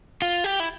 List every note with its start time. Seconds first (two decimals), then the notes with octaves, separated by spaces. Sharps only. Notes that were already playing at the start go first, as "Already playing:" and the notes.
0.22 F4
0.44 G4
0.60 E4